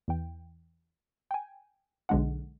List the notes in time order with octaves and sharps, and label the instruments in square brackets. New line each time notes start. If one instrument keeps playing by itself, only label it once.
[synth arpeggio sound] E2 E3 G5
G5 G#5
B1 D3 G#3 D4 F#5